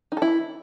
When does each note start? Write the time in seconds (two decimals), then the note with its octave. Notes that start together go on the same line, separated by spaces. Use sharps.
0.12 D#4
0.17 A4
0.22 E4